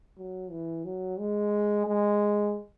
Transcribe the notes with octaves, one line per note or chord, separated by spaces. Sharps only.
F#3
E3
F#3
G#3
G#3